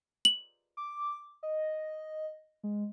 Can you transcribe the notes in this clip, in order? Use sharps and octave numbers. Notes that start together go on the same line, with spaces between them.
F#7
D6
D#5
G#3